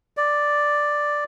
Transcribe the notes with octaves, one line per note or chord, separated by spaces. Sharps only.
D5